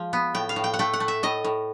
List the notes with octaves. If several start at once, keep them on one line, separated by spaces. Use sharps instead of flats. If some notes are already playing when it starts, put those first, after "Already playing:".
Already playing: F3 G#3
B3
A2 G5
F5
A2
G5
F#5
A3 G5
F#5
A3
E5
A2 D#5
A2